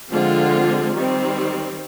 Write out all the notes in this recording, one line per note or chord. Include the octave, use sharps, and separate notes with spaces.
D3 F3 G#3 C4 F4
D#3 G3 C4